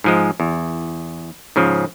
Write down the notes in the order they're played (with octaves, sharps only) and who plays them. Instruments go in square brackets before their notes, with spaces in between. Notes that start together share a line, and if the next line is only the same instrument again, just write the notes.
[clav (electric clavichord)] G#2 F3 G#3
E2
G#2 C#3 F3